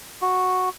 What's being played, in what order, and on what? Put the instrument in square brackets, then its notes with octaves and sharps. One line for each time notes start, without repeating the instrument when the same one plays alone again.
[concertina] F#4